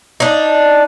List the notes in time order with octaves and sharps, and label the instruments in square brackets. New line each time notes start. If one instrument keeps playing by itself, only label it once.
[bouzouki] D4 D#4